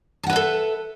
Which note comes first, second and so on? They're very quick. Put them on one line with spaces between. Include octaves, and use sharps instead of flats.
A5 F#5 B4 E5 A4